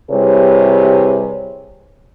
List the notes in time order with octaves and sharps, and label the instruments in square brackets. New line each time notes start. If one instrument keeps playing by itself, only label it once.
[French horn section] C3 G3 E4 G#4 B4 C#5